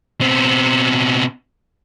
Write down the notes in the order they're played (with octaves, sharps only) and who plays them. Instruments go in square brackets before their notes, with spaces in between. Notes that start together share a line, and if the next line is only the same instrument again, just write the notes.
[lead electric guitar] B2 C4